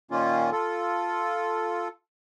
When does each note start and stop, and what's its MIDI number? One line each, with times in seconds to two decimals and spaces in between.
0.11 0.51 46
0.11 0.51 51
0.11 0.51 58
0.11 0.51 61
0.11 0.51 65
0.52 1.88 65
0.52 1.88 69